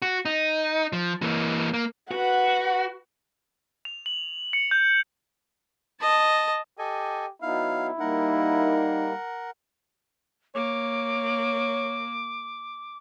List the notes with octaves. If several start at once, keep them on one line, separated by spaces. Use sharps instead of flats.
F#4
D#4
F3
E3 A#3
A#3
F#4 B4 F#5
F7
F#7
C#7
G6
D#5 A5
G4 A4 D#5 G#5
F#3 B3 D#4 E4 F5
G3 A#3 D#4 A#4 F#5
A#3 C#5 D6